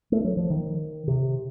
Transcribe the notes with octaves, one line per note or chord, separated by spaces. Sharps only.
A3
F#3
F3
D#3
C3